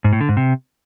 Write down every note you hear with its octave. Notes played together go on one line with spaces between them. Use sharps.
G#2
A2
D3
G#2
C3